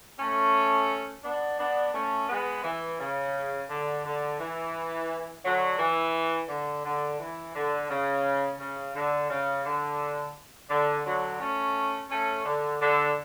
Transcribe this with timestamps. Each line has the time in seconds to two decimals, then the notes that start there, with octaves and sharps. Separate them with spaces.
0.19 A3 C#4
1.24 B3 D4
1.59 B3 D4
1.94 A3 C#4
2.29 G#3 B3
2.64 E3
3.00 C#3
3.69 D3
4.05 D3
4.39 E3
5.44 D3 F#3
5.79 E3
6.49 D3
6.85 D3
7.20 E3
7.55 D3
7.90 C#3
8.59 C#3
8.95 D3
9.30 C#3
9.65 D3
10.70 D3
11.05 D3 F#3
11.40 A3 C#4
12.10 A3 C#4
12.45 D3
12.81 D3